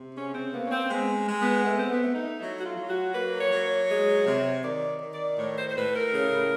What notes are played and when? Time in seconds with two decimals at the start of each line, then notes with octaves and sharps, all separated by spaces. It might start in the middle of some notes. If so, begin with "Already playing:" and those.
Already playing: C3
0.16 C#3 C#4
0.34 C4
0.53 A#3 B3
0.65 C#4
0.71 C4
0.90 G#3 B3
1.27 G#3
1.41 B3
1.65 A3 B3
1.78 C4
1.90 B3
2.02 A3
2.15 D#4
2.40 F#3 E4
2.59 F#4
2.65 F4
2.76 F#3
2.89 F#4
3.14 A#3 B4
3.39 C#5
3.51 F#3
3.65 C#5
3.89 G#3
4.26 C3
4.63 D#3 D5
5.01 D#3
5.13 D5
5.37 A2 C#5
5.56 C5
5.69 C5
5.75 A2 B4
5.94 A#4
6.12 C#3